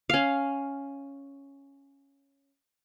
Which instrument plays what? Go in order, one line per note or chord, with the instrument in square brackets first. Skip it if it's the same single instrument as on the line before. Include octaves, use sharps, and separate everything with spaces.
[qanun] C#4 F5